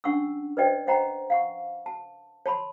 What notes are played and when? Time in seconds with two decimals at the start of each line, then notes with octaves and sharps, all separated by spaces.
0.04 C#4 D4 F#5 C#6 E6
0.57 B4 C5 D5 D#5 G5
0.87 C5 D#5 F#5 G5 A#5
1.30 F5 F#5 C#6
1.86 A5
2.46 C#5 A5 B5 C6